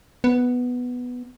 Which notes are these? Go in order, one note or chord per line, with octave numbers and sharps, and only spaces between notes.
B3